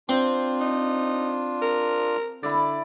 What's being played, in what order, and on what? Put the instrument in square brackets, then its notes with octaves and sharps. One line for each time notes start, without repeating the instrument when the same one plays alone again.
[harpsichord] C4 [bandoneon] D4 F4
[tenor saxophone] D#4
A#4
[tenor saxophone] D3 [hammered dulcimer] E4 D5